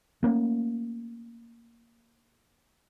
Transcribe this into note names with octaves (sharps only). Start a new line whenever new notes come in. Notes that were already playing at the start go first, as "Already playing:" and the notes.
A3 A#3 C#4